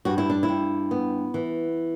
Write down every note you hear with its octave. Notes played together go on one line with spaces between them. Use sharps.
G2 F#4
E4
D4
E4
G2
B3
E3